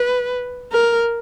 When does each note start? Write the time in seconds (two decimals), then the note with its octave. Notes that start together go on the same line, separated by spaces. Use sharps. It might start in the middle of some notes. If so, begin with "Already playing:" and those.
Already playing: B4
0.72 A#4